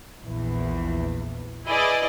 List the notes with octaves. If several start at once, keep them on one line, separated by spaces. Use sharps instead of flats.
A#1 E2 E3
E4 G#4 B4 D5 D#5